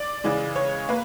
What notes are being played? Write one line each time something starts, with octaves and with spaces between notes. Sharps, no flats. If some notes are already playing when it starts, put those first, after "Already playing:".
Already playing: D5
C#3 E3 G#3
C#5
A#3 B4